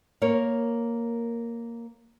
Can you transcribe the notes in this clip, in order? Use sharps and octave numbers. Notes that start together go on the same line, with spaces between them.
A#3 A#4 C#5